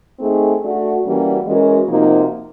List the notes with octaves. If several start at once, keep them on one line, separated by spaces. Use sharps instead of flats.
A3 C4 D#4 G#4
A3 D4 F#4
E3 G3 A#3 C#4 F#4
E3 G#3 C#4 F#4 A#4
C3 F3 A#3 D#4 F#4